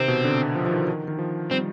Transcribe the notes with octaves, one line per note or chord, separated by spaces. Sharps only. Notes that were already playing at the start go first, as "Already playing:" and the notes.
Already playing: C3 D#3 C4
B2
D3
F3
F3
D#3
D#3
D#3
F3
G3 C4